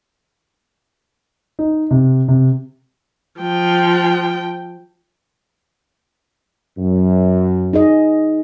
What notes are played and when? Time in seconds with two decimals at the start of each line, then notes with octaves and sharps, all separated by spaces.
1.59 D#4
1.91 C3
2.28 C3
3.41 F3 G5
6.78 F#2
7.73 D#4 G#4 D#5